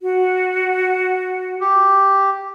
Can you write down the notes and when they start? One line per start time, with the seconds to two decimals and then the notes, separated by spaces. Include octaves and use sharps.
0.02 F#4
1.61 G4